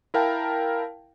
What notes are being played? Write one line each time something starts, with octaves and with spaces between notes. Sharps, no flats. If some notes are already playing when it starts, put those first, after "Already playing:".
E4 A#4 F5 G5 A5